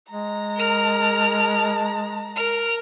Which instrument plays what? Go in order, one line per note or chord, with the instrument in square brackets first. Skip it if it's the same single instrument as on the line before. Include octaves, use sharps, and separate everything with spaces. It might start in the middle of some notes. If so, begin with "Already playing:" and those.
[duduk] G#3 [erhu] A#5
[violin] A#4 F6
A#4 F6